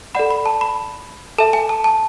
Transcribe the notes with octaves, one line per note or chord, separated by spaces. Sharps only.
A4 D5 F#5 B5
B5
A5
B5
A4 E5 A5
G#5
A5
A5